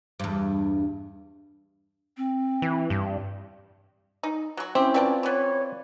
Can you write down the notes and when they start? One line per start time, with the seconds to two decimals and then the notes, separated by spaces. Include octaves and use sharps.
0.20 E2 G2
2.17 C4
2.62 E3
2.90 G2
4.23 D#4
4.57 F#3 F#4
4.75 C4 C#4 E4 G4
4.94 A3 F4 B4 D5 G5 A5
5.23 E3 B3 C#5